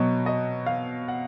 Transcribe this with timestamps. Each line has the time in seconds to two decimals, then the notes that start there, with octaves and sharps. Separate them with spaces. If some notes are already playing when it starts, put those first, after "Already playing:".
Already playing: B2 F#3 D#5
0.26 D#5
0.66 F5
1.08 F#5